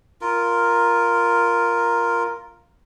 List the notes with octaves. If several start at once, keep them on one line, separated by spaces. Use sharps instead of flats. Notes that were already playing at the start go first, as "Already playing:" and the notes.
F4 A#4